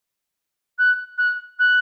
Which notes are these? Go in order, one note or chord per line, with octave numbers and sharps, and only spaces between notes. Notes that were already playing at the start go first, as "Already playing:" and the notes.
F#6
F#6
F#6